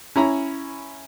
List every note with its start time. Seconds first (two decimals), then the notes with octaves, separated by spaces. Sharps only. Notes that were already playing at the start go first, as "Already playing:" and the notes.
0.16 C#4 E4 A#5 B5